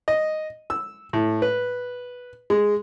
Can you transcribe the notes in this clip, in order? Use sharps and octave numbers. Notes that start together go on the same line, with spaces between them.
D#5
E6
A2
B4
G#3